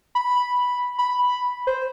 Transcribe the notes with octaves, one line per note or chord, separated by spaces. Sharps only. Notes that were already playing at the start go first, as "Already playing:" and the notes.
B5
B5
C5